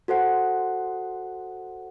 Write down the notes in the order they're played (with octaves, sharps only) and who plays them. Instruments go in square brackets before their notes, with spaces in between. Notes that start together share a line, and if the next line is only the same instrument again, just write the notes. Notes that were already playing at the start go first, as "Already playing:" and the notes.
[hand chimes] F#4 A4 C5 F#5